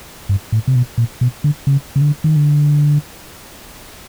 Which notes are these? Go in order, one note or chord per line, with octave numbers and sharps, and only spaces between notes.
G2
A2
C3
B2
A#2
B2
D3
C#3
C#3
D3
D#3
D3